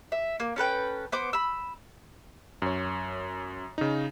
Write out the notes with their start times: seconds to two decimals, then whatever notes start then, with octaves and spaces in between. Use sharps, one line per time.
0.12 E5
0.40 A#3
0.56 C#4 A4 B4 G5
1.12 B3 C5 D6
1.33 B5 E6
2.62 F#2 C#5
3.78 C#3 D#4